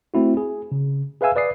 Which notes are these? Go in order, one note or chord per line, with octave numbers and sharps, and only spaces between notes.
A3 C4 E4 F#4
G#4
C#3
G#4 B4 E5 F5 G#5 E6
B4 D5 D#6 C7